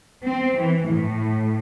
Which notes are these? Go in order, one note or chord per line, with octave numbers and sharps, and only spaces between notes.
C4
E3
A2